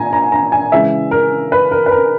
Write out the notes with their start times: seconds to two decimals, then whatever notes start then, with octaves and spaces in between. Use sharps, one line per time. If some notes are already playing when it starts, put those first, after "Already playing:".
Already playing: A#2 G#5 A#5
0.13 A#5
0.32 A#5
0.52 G#5
0.72 C#3 E3 G#3 E5
1.11 A#4
1.52 B4
1.71 A#4
1.86 B4
1.91 A#4